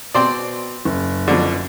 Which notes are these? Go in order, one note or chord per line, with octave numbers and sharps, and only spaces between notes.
B2 C4 C5 D5
F#1
F2 B2 D3